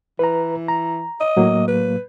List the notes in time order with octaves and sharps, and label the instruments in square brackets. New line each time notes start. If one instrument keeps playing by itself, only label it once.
[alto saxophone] E3 [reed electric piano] B4 A#5
[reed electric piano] A#5
[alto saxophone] D#5
[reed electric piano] A2 F#3 A#3
[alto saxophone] B4